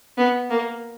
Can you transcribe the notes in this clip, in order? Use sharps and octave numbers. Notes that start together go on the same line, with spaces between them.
B3
A#3